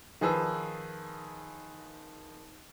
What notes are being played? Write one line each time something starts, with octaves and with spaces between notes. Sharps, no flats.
D#3 F3 G#4 B4 E6